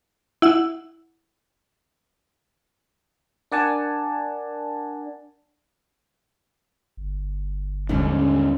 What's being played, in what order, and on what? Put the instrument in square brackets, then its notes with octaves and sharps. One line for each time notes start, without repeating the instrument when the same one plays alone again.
[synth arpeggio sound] E4 F#5 E6
[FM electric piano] D4 A#4 D5 F#5 G#5 A5
[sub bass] G1
[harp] D#2 G3 C#4 [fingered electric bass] G#2 D3 D#3